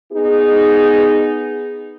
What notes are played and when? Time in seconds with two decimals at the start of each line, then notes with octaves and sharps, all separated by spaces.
0.12 B3 D#4 G#4